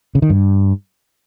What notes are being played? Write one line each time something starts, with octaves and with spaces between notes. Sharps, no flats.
C#3
D#3
G2